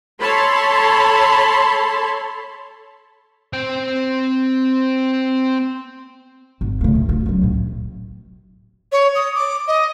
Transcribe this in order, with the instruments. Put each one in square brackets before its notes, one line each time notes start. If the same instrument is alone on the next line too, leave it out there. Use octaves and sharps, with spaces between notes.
[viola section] A4 C#5 A5 B5 C6
[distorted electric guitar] C4 G5
[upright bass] G#1
C#3 A3
D#2
F4
C#2 F#3
A2
[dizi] C#5
D#6
D6
D#5